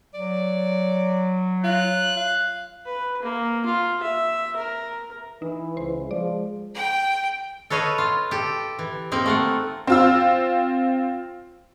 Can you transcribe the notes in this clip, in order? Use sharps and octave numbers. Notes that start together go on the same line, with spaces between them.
F#3 D5
F4 F#6
F5
B4
A#3
F4
E5
A#4
E3 D#4
C#2 C5
F3 G#3 D5
G5
A4 B4 C#5 D#5 F5
F4
G4 A4
E3
A#3 C4 D#4
A3 F4 F#5
C4 F4 E6